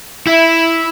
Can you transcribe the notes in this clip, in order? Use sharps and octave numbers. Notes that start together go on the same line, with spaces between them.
E4